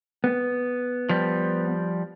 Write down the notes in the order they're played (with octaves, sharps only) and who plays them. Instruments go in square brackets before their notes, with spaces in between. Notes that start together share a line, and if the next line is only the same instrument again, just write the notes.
[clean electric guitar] B3
[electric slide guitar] F3 G3